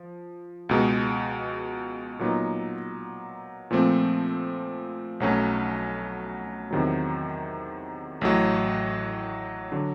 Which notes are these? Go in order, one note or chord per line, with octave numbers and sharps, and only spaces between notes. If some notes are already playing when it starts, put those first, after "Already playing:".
Already playing: F3
C#2 B2 G#3
A#2 F#3 B3 D#4
A#2 F3 A3 C4
B1 B2 F#3 A3 C#4
E2 C3 D#3 F#3
A1 A2 F#3
D3 F#3